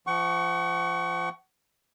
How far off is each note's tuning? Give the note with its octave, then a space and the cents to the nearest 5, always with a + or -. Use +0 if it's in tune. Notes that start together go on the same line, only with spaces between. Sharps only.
F3 -25 F#5 +35 C#6 +5